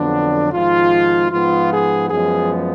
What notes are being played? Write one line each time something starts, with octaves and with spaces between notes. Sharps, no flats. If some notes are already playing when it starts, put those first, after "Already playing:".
Already playing: F2 D3 F#3 B3 D4
G#1 G#2 F3 F4
G#2 F3 B3 F4
G#4
F#2 F3 G#3 B3 G#4